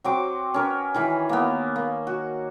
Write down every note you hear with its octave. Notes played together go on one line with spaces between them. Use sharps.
F#3 C4 D6
C#4 A#4 B4
D#3 E3 B5
A#3 B3
A#3
F#4